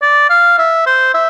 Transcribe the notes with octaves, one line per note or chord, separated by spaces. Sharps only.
D5
F5
E5
C5
E5